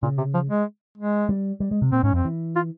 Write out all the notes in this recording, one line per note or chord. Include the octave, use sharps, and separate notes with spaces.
A#2 C#3
C3
F3
G#3
G#3
G3
G3
G#3
C3
A#2 C4
G#2 C#4
F2 C4
E3
F4